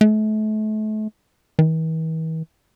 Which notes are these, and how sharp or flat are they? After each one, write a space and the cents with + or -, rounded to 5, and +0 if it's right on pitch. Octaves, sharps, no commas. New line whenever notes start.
A3 -35
E3 -45